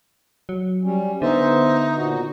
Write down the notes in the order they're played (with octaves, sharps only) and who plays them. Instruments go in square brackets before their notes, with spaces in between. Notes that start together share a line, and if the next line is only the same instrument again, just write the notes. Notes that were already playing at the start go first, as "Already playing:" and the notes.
[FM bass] F#3
[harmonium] G3 C#4
[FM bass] D3 [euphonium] B3 [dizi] D#4 [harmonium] C5 E5
[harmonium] A#2 F#4